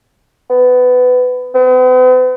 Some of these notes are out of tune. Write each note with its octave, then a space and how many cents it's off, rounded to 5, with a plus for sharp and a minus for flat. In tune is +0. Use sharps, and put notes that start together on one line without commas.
B3 +20
B3 +45